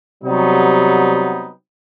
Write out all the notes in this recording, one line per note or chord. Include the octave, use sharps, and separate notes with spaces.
C3 F#3 G3 B3 C4 D#4